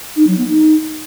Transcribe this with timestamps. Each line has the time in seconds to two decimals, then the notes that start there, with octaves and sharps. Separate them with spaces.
0.16 D#4
0.27 F#3
0.38 B3
0.48 D#4